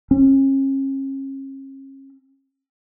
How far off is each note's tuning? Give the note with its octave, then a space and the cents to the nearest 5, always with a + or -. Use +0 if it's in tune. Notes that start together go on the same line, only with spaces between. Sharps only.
C#4 -40